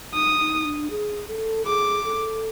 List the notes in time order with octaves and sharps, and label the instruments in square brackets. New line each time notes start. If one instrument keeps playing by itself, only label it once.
[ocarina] D#4 [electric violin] D#6
[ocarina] D#4
D4
G#4
A4
[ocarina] G#4 [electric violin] D6
[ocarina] A4